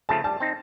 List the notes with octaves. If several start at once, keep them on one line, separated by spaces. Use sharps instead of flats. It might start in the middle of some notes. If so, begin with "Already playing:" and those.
C#3 F3 A3 A5
G3 A5
C4 D#4